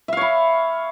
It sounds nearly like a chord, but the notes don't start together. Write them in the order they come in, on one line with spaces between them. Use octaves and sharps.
E5 F5 C#5 B5